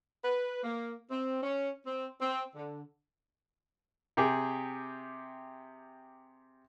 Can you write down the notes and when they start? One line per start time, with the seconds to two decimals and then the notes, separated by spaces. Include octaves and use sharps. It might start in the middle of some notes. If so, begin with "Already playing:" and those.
0.25 B4
0.64 A#3
1.11 C4
1.43 C#4
1.86 C4
2.21 C4
2.55 D3
4.17 C3 G4 G#4